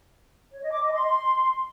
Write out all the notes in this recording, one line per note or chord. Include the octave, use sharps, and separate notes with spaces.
C#5
D#5
D6
D#5
C6